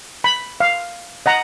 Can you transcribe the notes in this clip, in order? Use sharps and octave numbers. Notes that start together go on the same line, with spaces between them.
B5
F5
D#5 F#5 A#5